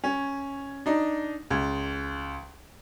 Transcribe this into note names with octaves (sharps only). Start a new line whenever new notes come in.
C#4
D4 D#4
C#2